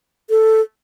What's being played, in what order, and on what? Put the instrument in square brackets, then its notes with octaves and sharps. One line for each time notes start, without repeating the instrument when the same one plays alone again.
[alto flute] A4